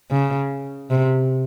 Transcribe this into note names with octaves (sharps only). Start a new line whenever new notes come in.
C#3
C3